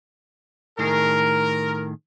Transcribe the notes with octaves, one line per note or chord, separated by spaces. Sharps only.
A2 D#3 G#4 A#4